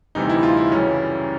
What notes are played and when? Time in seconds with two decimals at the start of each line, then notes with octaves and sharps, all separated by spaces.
0.15 D2 C3 E3 G3 D#4
0.30 E4
0.43 F4
0.57 E4
0.71 F#2 C#3 E3 G3 C#4